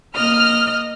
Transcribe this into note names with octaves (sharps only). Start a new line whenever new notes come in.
A#3 D#5 F6